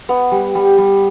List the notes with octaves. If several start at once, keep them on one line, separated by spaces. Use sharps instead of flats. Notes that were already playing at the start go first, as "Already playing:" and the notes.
B3 F#5
G3
G3
G3